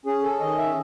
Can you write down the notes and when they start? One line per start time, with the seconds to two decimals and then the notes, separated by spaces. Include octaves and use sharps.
0.06 C#4 G#4
0.23 A4
0.40 D#3 D#5
0.58 E5